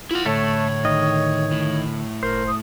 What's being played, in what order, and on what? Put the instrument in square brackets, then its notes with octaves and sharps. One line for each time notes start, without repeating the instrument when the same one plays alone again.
[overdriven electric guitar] E4 F#5 [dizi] F4
[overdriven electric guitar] A2 [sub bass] D3 [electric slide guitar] A3 A4 [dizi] C#5
[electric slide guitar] D#3 D#5
[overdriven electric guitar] A2
[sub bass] F#1 [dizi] A#4 [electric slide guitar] C5
[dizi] D#6